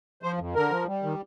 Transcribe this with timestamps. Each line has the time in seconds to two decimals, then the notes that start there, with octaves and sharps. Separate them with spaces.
0.22 F3 C5
0.38 F2
0.55 D3 A#4
0.70 F3
0.87 G3
1.03 D#3